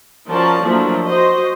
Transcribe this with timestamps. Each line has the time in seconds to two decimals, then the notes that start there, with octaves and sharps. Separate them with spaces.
0.30 F3 C#4 F#4 A#4 D5 A5
0.64 F3 F#3 A3 A#3 D4 E4
1.06 F#4 C5 D#5